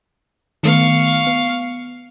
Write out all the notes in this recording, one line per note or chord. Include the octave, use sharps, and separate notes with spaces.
D#3 A3 B3 F5 C#6
B3